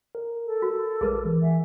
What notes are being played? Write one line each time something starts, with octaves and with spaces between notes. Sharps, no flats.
A#4
A4
F#4
A#1 G#3 G#4 A#4 B4
E3
E5 F#5 G#5